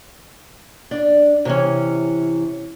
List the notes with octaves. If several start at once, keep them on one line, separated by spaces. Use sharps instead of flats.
D4 D5
C3 E3 C#4